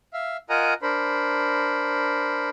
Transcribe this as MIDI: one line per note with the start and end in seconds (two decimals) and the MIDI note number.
0.13 0.37 76
0.13 0.37 77
0.50 0.74 65
0.50 0.74 70
0.50 0.74 75
0.50 0.74 78
0.50 0.74 80
0.50 0.74 82
0.82 2.50 62
0.82 2.50 70
0.82 2.50 72
0.82 2.50 83